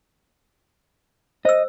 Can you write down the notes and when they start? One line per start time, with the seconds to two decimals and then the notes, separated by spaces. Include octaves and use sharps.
1.45 C5 D#5 E6